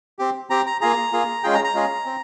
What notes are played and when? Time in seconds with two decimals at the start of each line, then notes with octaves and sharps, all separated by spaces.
0.19 C4 G4
0.50 C4 G4 A#5
0.66 A#5
0.81 A#3 F4 G#4 A#5
1.12 A#3 F4 G#4
1.43 G#3 C#4 F4 G#4 G5
1.54 A#5
1.64 A#5
1.75 G#3 C#4 F4 G#4
2.05 C4